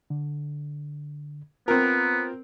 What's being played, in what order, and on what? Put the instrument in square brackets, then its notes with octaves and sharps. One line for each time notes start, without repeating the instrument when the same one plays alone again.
[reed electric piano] D3
[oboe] B3 [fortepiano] C4 A#4 [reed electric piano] F4